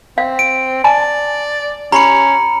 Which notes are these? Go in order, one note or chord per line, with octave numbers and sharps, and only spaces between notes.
C4 F5
D7
D5 G#5 A5 B5
C#4 G4 A#5 B5 C#7